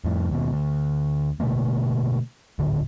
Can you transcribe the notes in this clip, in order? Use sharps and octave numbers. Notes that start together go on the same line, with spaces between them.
F2 A2
D#2 B2
D2
B2 D3 A3 A#3
D1 G#1 D3